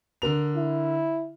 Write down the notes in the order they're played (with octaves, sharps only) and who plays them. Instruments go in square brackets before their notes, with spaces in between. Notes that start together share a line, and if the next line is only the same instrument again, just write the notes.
[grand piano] D3 A#4 F7
[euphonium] E4